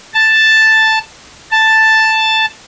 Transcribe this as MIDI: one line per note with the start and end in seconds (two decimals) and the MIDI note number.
0.14 0.99 81
1.51 2.45 81